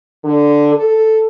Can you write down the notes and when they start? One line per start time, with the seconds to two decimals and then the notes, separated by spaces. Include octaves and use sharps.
0.24 D3
0.74 A4